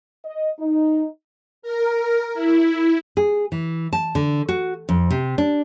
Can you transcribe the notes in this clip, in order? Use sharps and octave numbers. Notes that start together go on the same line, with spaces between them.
D#5
D#4
A#4
E4
G#4
E3
A5
D3
F#4
F2
C3
D4